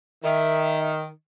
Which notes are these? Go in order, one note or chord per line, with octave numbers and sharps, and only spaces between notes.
D#3 E5